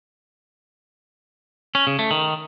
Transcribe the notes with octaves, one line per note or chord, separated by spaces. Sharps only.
C#4
C#3
A3
D#3